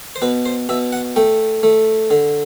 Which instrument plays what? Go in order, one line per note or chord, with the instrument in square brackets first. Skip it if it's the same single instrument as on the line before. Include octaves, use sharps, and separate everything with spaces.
[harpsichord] C5
B2 B4
C5
B2 E5
F#5
A3 G5
A3
D3